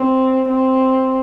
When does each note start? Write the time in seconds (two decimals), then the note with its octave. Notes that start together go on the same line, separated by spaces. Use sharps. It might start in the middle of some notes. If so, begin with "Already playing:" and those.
Already playing: C4
0.49 C4